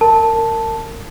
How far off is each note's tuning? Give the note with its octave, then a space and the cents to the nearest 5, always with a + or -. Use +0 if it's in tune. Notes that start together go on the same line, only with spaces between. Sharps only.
A#4 -25 A5 +0